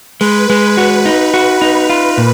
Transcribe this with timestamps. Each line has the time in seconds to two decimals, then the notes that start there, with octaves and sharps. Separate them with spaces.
0.21 G#3 B4
0.50 G#3
0.77 F#4
1.06 D#4
1.34 F#4
1.62 D#4
1.90 F4
2.18 A#2